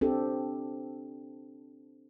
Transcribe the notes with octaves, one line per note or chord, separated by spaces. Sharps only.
C4 D4 G4 A4